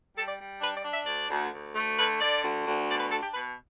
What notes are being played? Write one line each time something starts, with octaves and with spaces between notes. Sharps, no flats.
G3 A4
D5
G3
D4 B4
D5
D4
E5
D2 D5
D2
D2
A3
D3 B4
D3 D5
D2
D2
B2 D5
B4
D4 A4
G4
B2 B4